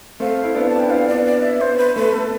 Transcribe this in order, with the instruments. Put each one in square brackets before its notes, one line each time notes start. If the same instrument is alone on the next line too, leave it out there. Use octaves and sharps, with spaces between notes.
[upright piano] A3 C4 [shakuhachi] F5
[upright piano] E4
B3 D4
[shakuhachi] A5
[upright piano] D4
[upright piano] E4 [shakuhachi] G5
[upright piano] D4 F4 [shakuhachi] F5
[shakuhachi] D5
[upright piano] B3
[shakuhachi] D5
E5
[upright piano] B3 [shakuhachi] C5
[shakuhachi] B4
[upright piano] A3 [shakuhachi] B4
[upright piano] A3 [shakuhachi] A4